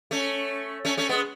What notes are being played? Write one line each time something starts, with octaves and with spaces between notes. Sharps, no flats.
A3 C#4
A3 C#4
A3 C#4
G#3 B3